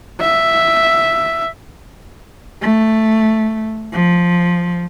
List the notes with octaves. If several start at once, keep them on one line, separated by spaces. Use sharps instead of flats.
E5
A3
F3